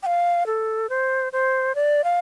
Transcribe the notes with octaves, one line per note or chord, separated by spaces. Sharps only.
G5
F5
A4
C5
C5
D5
F5